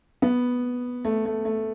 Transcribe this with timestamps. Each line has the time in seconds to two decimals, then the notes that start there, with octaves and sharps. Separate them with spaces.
0.22 B3
1.05 A3
1.25 A3
1.45 A3